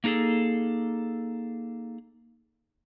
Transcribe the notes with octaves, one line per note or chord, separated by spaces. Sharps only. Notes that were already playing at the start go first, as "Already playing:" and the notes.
A#3 D#4 F#4 G#4 A4